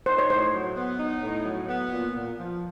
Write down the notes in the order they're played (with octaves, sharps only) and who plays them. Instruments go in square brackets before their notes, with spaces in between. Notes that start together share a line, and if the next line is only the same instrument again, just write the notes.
[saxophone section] D#4 [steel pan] C5
[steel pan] C#5
[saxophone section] A2 [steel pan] C5
[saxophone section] F#3
B3
D#4
A2
F#3
B3
A#2
A#2
F3